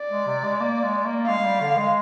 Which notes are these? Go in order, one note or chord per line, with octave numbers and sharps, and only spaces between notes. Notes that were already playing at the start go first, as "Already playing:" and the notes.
Already playing: D5
G#3
C3
G#3
A#3
G#3
A#3
G#3 F5
G#3
G3
D3
G#3